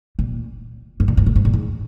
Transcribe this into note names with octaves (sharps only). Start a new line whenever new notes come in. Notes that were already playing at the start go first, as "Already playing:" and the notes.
A#2
G#2
A#2
G#2
A#2
G#2
A#2
G#2